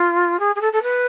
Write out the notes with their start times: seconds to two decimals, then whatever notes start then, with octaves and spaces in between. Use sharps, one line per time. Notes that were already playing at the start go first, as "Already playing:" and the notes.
Already playing: F4
0.39 G#4
0.55 G#4
0.61 A4
0.72 A4
0.82 B4